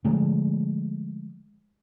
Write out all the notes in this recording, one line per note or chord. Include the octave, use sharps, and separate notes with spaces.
D3 F3 G#3 A3